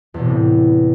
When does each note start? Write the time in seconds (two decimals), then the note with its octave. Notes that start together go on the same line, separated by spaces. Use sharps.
0.14 E2
0.19 B2
0.24 C3
0.29 A2